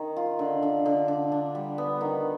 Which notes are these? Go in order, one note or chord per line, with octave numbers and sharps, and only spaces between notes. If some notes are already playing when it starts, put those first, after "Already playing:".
Already playing: D#3
F4
D3
D3
D3
D3
D4
G3
B3
D#3